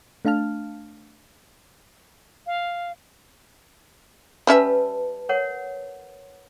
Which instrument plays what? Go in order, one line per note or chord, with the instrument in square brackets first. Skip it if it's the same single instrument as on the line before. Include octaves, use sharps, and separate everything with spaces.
[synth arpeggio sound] A3 D4 F5 A5 F6
[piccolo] F5
[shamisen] G3 C#4 E5 [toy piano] B4 A5
[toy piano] A#4 C#5 F#5